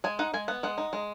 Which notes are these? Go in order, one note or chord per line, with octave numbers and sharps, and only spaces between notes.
G#3 G#5
D#4 F#5
G#3 G#5
B3 F#5
G#3 F#5
D#4
G#3